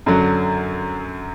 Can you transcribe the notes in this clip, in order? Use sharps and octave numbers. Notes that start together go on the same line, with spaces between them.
F#2 D3 F#3